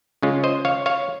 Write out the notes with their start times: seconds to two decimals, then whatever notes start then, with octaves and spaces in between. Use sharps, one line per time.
0.22 C#3 G#3 C#4 F4
0.44 C5 D#5
0.65 C#5 F5
0.86 C#5 F5